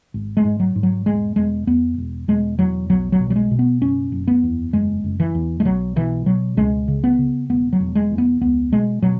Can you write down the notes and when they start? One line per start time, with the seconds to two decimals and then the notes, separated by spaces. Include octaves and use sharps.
0.14 G#1
0.37 G#3
0.44 G#2
0.60 F#3
0.76 G#2
0.83 F#3
1.06 E1 G#3
1.36 E1 G#3
1.67 E2 B3
1.98 E1
2.28 E1 G#3
2.59 E2 F#3
2.90 B1 F#3
3.12 F#3
3.20 B2
3.30 F#3
3.36 G#3
3.51 B2
3.59 B3
3.82 F#1 C#4
4.12 F#1
4.28 B3
4.43 E2
4.73 F#1 G#3
5.04 F#1
5.20 E3
5.35 E2
5.60 G#3
5.65 B1 F#3
5.96 B2 E3
6.26 B2 F#3
6.57 C#2 G#3
6.88 C#3
7.04 B3
7.18 C#3
7.49 E1 B3
7.73 F#3
7.80 E1
7.95 G#3
8.11 E2
8.18 B3
8.41 C#2 B3
8.72 B2 G#3
9.02 B2 F#3